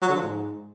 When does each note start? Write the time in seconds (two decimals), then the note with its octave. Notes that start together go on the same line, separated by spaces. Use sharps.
0.02 F#3
0.09 D3
0.16 F3
0.23 G#2